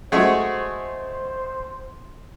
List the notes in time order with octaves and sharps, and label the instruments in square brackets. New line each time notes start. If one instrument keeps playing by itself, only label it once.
[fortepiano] G#3 A3 G#4 [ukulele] F#4 F#5 [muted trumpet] C5